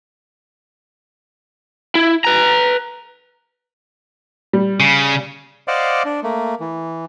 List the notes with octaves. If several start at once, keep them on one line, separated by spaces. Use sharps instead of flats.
E4
B4 A#5
G3
C#3
C5 D5 D#5 F5 F#5 D6
D4
A3 A#3
E3